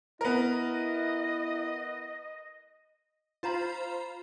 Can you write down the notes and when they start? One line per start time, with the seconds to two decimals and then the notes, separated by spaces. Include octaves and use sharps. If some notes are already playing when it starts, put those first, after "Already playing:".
0.21 B3 E4 A#4 D#5
3.43 F4 C5 F5 A#5 B5